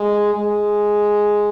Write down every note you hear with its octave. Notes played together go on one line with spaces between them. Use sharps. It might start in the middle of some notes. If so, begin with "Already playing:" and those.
Already playing: G#3
G#3